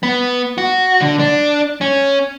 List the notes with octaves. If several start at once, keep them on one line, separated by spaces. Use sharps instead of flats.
B3
F#4
D3
D4
C#4